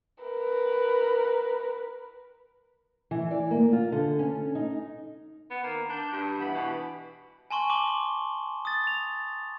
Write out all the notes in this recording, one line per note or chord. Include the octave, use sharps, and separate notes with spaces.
A#4 B4
E3
D5
A#3
F4
D3
C#4
D#4
B3
D#3 A#3
D4 G6
G2
E3 B3 B5
B2
G#5 A5 C6 C#6
D6 F#7 G7
D#6 A6
F7